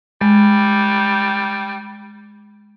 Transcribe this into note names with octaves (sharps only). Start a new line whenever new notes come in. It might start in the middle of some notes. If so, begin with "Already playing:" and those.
G3 G#3